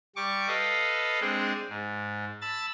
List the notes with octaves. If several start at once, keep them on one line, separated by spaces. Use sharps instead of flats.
G3 C#6 D6
A4 B4 D#5 F5
G#3 C4 D4 G#4
G#2
A5 B5 E6 A6